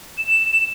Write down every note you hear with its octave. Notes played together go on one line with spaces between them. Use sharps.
E7